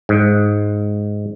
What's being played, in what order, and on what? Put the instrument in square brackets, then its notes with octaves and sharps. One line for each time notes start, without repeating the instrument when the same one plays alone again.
[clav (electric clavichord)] G#2